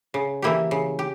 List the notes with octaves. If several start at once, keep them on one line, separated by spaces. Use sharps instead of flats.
C#3
E3 A#3 E4 G4
C#3
G4